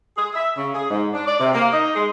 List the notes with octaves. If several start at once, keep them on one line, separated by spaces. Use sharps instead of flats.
G#4
E5
C#3
G#4
G#2
D4
D5
C3
A#3
D#4
G#3